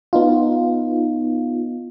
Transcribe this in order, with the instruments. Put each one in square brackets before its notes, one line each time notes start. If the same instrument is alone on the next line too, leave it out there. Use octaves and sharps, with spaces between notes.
[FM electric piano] B3 D#4 F4